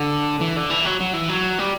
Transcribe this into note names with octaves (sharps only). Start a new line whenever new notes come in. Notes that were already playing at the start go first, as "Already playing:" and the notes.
Already playing: D3
E3
D3
E3
F#3
F#3
E3
F#3
G3